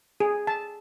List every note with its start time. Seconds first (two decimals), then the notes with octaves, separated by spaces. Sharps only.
0.20 G#4
0.47 A5